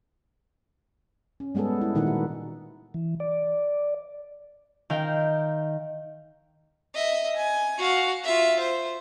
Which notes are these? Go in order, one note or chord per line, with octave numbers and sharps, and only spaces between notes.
C#4
G3 G#3 B3 G#4 A4
E4
A#2 D#3 D#4 E4 F#5
F#4
E3
D5
D#3 F5 G5
D#5 E5
G#5
F#4 F5
F4 E5
C5